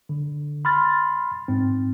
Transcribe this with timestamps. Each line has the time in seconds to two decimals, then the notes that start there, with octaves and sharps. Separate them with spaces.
0.09 D3
0.65 B5 C6 F6 A6
1.48 G#2 C4